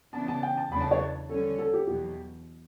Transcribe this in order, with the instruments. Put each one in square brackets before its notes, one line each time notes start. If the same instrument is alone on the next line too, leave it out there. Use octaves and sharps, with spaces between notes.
[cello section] C#3 E3 B3 D4 [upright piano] A5
[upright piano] A5
G5
A5
[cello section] E2 C#3 F#3 A3 D4 [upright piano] B5
[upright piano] A5
C#5
[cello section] D3 G3 C#4 [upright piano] A4
[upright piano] A4
G4
[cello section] E2 B2 F#3 [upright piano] G4